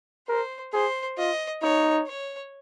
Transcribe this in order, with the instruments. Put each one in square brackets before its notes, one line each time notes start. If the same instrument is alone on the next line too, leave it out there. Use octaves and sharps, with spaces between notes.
[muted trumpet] A#4 [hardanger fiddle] C5
[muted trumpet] G#4 [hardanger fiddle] C5
[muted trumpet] F4 [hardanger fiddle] D#5
[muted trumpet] D#4 [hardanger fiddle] C#5
[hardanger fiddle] C#5